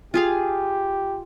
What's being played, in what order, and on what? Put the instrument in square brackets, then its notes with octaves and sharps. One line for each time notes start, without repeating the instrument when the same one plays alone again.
[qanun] F4 G#4 F5 [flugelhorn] G4